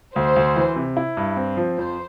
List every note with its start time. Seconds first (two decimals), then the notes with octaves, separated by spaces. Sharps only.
0.16 D2 C5
0.36 D2
0.56 E3
0.76 C3
0.97 E4
1.17 G2
1.37 C4
1.57 F3
1.77 F2 C5